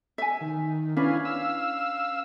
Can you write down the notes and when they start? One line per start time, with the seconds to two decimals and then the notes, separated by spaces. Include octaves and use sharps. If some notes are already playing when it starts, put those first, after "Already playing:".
0.18 E5 G#5
0.41 D#3
0.97 C#4 D4 E4 B4 F5 G#5
1.25 F5 E6